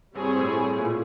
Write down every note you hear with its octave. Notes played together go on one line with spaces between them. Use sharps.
G2 G3 C4 E4 G#4 C#5
A2
A#2
A2